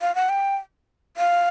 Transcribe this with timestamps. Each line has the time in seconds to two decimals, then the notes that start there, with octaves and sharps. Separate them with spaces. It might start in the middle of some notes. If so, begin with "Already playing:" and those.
0.01 F5
0.15 F#5
0.29 G5
1.17 F5